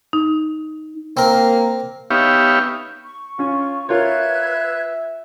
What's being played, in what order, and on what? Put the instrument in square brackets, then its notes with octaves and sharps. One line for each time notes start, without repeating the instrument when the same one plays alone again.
[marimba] D#4
[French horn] A#3 [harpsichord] C4 A#4
[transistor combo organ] B3 D#4 G4 C#5 E5 F5
[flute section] C#6
[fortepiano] C#4 [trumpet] F4
[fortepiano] F4 A#4 C#5 [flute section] B4 F#6 G#6 [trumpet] E5